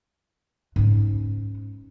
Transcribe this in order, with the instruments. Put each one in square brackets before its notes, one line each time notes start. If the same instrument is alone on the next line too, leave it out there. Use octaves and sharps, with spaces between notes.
[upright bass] G#2 C#4